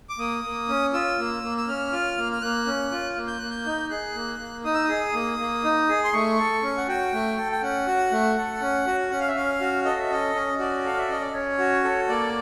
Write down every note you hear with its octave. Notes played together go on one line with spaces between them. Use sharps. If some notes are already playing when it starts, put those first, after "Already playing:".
D6
A#3 D#6
A#3
C#4
F4 E6
A#3
A#3
E6
C#4 F6
F4
A#3
F6
A#3 F#6
C#4
F4
A#3
G6
A#3 F#6
G6
D#4
G#4 F#6
A#3
A#3
D#4 D#6
E6
G#4 D#6
A#3
A#3
D#4
G#4
C6
A3 C#6
A4
C#4
F#5
F#4 G5
A3
A4
G5
C#4 F#5
F#4
A3
A4
C#4
F#4
C#4 F#5
F5
E5
C#4 F5
F#4
A4 D#5
E5
C#4 D#5
C#4
F#4 D5
A4 F5
E5
C#4 D#5
D5
C#4 C#5
F#4
A4
A#3 D5